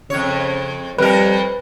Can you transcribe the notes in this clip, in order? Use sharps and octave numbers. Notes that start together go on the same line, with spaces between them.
F2 C#3 C#5
F2 G3 A#4 B4